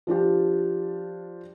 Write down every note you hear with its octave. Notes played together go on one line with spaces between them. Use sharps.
F3 D4 F4 G4